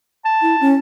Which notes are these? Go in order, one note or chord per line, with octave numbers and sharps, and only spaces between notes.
A5
E4
C#4